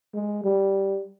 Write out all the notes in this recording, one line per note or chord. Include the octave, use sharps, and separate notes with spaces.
G#3
G3